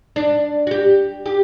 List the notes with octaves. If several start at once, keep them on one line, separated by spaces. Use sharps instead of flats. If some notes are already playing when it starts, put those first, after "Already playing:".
D4
F#4
G4
G4